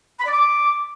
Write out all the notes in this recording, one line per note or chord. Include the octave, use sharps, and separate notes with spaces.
B5
D5
D6